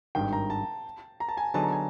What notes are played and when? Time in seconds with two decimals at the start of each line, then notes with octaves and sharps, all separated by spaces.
0.15 G#1 G2 D#3 G5
0.33 A#5
0.50 A5
1.20 A#5
1.29 A5
1.37 G#5
1.54 D3 F#3 B3 D#4 G#4 A5
1.63 A#5
1.72 G#5